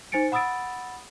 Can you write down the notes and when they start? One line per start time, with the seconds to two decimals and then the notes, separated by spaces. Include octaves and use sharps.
0.12 D#4 C5 G#5 A6 C#7 D7
0.32 F#5 B5 D#6 E6 A6 D7